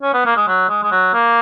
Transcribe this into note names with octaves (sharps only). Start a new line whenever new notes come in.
C#4
B3
A#3
G#3
F#3
G#3
G#3
F#3
A#3